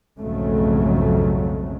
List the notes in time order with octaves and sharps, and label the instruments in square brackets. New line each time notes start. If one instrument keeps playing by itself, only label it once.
[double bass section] B1 F2 G#2 C#3 F#3 A3